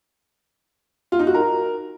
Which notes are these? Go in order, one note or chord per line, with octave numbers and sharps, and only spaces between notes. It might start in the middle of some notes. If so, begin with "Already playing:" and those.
F4
D#4
F#4
A#4